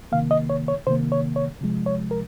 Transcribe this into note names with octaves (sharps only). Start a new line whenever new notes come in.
C3 D#3 A#3 F5
D#5
C#5
C#5
C3 D#3 A#3 C5
C#5
C#5
C3 F3 G#3
C#5
A#4